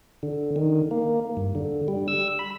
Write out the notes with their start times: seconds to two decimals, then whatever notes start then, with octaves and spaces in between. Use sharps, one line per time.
0.23 D3
0.56 D#3
0.91 A#3
1.37 G2
1.55 D3
1.88 G3
2.08 E6
2.39 B5